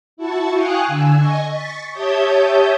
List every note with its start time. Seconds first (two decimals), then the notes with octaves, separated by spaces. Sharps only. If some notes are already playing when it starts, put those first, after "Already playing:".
0.17 E4 F#4 A5 C#6
0.53 F5 G5 G#5 C#6 D#6 F#6
0.87 D3 G#5 E6
1.15 D#5 G#5 C#6
1.50 C#6 A6 B6
1.91 G4 C#5 E5 A5 D#6 G6